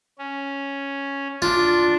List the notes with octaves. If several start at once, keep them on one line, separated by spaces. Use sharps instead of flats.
C#4
D4 F4